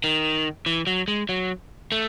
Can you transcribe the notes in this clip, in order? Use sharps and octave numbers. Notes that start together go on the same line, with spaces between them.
D#3
E3
F#3
G#3
F#3
A3